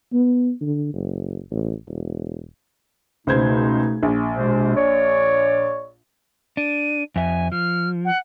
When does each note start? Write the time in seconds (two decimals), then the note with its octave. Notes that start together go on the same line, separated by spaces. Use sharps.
0.13 B3
0.61 D3
0.94 F#1
1.51 A1
1.88 E1
3.27 C#2 B2 A3 D#4 C5 G#6
4.03 A#1
4.34 B2 G#3 C5
4.76 C#5 D5
6.57 D4 D#7
7.16 F2 E5 G#5
7.52 F3 F6
8.05 F#5